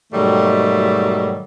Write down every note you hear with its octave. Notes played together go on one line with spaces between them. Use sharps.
G#2 B2 D#3 F#3 G3 A3